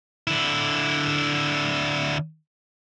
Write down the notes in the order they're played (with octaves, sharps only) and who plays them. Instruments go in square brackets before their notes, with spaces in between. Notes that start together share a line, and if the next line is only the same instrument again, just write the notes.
[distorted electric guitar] D3 E4